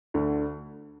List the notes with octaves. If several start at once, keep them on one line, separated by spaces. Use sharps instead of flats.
D2 D3